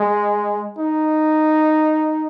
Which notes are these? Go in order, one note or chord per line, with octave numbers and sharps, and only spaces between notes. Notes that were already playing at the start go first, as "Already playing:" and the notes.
Already playing: G#3
D#4